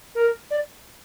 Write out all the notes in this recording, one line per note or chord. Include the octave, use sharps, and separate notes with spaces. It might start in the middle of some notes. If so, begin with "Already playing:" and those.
A#4
D5